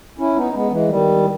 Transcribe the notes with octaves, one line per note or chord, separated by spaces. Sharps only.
C#4 E4
B3 D#4
G#3 B3
E3 G#3
D#3 G3